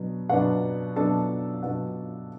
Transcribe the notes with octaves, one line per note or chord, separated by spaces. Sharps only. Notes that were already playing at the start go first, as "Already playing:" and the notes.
Already playing: B2 F#3 B3 D4
B2 F#3 B3 D4 F#5
B2 F#3 B3 D4 A4 A5
B2 F#3 B3 D4 F#5